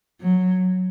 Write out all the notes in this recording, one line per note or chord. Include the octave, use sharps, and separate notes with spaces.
F#3